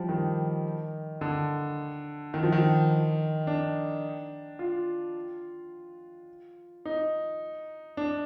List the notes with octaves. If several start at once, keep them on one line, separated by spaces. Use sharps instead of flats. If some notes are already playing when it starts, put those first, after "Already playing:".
Already playing: F3 G3
D#3
D3
D#3
F3
D#3
D4
F4
D#4
D4